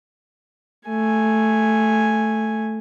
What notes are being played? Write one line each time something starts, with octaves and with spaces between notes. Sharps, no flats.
A3 G#5